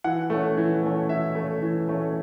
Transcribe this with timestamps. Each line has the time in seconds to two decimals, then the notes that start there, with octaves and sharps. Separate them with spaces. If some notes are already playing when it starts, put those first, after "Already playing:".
0.04 E3 F#5
0.30 A3 C#4
0.57 E3
0.83 A3 C#4
1.09 E3 E5
1.35 A3 C#4
1.62 E3
1.89 A3 C#4